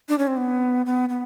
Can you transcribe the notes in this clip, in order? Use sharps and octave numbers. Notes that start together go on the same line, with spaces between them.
D4
C#4
C4
B3
B3
B3